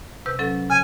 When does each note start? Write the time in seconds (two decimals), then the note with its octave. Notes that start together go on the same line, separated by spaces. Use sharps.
0.26 C3 B4 G6
0.39 F#3 C#4 A4
0.70 C#3 G#5